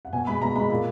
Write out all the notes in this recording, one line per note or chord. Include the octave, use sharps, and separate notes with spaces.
F#5
B2 G#5
G#3 B5
B2 A#5
G#3 B5
A#2